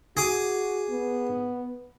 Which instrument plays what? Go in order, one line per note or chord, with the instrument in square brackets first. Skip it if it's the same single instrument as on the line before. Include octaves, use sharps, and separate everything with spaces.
[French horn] F#4 [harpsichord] G#4 D6
[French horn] B3